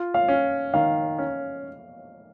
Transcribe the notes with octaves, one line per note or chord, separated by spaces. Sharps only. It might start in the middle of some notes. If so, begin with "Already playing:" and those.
Already playing: F4
F5
C#4
D#3 F5
C#4